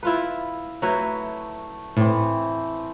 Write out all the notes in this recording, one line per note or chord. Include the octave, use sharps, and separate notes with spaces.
E4 F4 B4
F#3 A3 E4 B4
A2 E3 C4